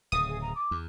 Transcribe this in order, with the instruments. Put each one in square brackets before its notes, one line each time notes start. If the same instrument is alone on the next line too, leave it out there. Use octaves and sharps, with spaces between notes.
[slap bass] D1 C#3 [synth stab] D#6
[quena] G#4
A#5
D6
[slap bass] E2